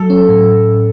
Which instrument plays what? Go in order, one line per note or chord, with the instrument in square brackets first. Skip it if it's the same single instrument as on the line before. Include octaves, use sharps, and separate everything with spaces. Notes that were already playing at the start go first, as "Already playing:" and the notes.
Already playing: [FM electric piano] F#3 [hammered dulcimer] A4
[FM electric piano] C#4
A2